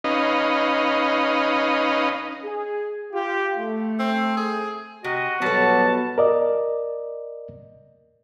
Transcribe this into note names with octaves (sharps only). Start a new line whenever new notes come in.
C#4 D#4 B4 D#5 F5
G#4
F4 G4
A3
C4
G#4
C3 F#4 D#5
B2 F#3 G3 B3 A4 A5
A#4 D5 D#5